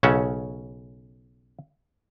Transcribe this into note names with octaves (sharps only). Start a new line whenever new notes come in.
B1 C#3 C#4 E5 F#5